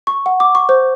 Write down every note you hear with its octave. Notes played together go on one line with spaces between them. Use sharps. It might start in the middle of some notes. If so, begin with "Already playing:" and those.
C#6
F#5
D6
C#6
C5